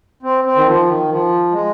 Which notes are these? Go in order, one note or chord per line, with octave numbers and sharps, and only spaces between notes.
C4
C4
D#3
F3
D#3
F3
G#3